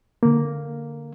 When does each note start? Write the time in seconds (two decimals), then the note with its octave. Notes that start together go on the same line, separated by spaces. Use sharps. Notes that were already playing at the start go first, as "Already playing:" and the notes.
0.23 D3 A#3